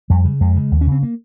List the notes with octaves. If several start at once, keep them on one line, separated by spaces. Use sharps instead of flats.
F2 G3
C#3
F2 G#3
C#3
D#2
C#4
C#3 C4
A#3